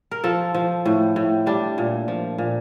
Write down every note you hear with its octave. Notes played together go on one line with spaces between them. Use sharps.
A#4
F3 A4
F3
A2
A2
G3 D4
A#2
F3
A#2